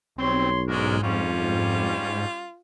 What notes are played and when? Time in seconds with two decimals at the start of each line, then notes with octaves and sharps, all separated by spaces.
0.18 B1 G3 C4 C#5 C6
0.68 G#2 G#3 C#4 D4 A#4
1.03 F2 G3 C#4 F4